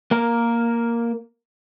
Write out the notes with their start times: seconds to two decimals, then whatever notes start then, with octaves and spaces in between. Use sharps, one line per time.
0.11 A#3 A#4